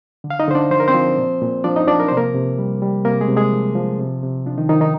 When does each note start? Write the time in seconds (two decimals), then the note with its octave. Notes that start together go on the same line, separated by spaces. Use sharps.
0.24 D3
0.30 F5
0.40 D#4 D#5
0.48 D3 C5
0.55 D4 D5
0.70 F3 C5
0.80 A#4
0.88 C4 C5
0.94 F3
1.18 A#2
1.41 A#2
1.64 F3 D4 D5
1.76 D#4 D#5
1.87 F3 D4 D5
2.00 A#4
2.08 C3 C5
2.17 A#3 A#4
2.35 C3
2.59 G3
2.82 G3
3.05 C3 A#3 A#4
3.21 G#3 G#4
3.29 C3
3.36 G#3 G#4
3.52 F3
3.75 F3
3.99 C3
4.23 C3
4.46 F3 D4
4.58 D#3 D#4
4.69 D#3 F3 D#4
4.81 D#3 D#4